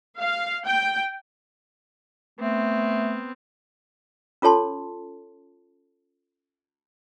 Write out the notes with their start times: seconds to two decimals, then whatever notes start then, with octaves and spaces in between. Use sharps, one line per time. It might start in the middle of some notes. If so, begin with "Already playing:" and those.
0.19 F5
0.66 G5
2.40 A3 B3 C4
4.42 C#4 F4 A4 C#5 A5 C6